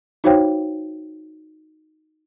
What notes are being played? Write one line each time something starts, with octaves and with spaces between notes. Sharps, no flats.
D#4 F#4 C5 C#5 F5 G5